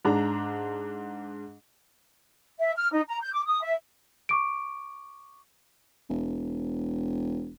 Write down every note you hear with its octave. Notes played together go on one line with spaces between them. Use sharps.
G#2 D4 A#5
E5
F6
D#4
A#5
G6
D6
D#6
E5
C#6 D6 D7
E1